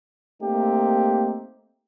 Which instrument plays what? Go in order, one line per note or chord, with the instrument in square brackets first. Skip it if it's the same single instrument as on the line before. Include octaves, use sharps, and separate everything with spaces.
[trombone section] A3 A#3 C4 D#4 G4